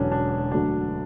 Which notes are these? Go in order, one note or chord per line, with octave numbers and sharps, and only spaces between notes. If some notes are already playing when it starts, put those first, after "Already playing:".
Already playing: E1 E2 D3 F#3 C#4 D4
D4
D2 D3 F#3 D4